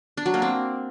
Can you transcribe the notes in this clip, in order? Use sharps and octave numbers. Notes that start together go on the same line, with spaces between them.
D4
F#3
A#3
C4